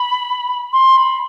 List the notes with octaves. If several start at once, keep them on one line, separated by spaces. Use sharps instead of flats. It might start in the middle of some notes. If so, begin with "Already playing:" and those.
Already playing: B5
C6
B5